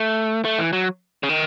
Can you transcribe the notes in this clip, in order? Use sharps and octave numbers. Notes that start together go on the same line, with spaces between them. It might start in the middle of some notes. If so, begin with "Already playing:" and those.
Already playing: A3
A3
E3
F#3
C#3
D#3